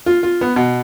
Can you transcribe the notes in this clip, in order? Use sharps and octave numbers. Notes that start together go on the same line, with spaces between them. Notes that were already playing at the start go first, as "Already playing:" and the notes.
F4
F4
B3
B2